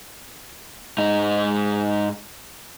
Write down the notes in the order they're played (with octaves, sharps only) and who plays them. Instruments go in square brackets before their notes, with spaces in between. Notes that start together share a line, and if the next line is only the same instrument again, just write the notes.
[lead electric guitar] G#2 D#4